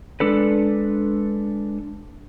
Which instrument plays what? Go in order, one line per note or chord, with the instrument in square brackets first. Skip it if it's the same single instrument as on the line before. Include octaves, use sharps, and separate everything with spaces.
[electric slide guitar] G#3 D4 A4 B4